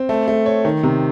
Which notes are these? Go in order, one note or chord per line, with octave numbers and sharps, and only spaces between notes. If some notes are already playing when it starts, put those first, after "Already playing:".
Already playing: C4
A3
A3
C#5
D#3
C3